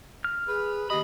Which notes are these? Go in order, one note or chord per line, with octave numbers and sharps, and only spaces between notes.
F6
G#4 B4
D#2 G4 D#5 B5